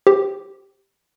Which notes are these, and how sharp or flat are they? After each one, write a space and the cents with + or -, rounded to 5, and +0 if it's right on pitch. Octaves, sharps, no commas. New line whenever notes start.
G4 +0 C5 +0